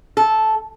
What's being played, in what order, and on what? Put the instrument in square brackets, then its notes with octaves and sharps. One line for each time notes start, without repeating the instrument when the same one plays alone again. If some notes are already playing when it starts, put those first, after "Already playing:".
[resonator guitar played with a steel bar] A4